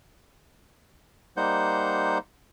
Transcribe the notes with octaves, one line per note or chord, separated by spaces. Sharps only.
G3 A#3 D#4 C5 F#5 G6